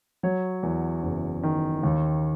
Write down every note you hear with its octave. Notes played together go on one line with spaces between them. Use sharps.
F#3 C#5
E2
F#1
D#3
D#2